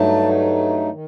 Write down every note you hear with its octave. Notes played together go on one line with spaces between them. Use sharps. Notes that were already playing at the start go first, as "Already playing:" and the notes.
Already playing: G2 F#3 A3 D#4 A5
D#3